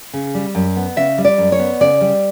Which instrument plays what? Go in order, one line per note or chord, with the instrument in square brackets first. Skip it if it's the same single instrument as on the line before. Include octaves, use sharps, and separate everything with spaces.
[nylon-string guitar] C#3
G3
F#2
B3
C#3 E5
G3
D5
F#2
C#5
B3
C#3 D5
G3